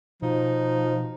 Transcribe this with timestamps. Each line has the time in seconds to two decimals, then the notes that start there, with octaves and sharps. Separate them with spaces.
0.22 B2 F3 D#4